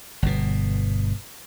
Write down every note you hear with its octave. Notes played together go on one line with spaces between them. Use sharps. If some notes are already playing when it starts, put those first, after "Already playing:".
G1 B2